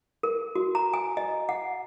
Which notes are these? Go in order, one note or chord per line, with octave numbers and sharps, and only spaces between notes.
A#4
F#4
A#5
G#5
D#5
F#5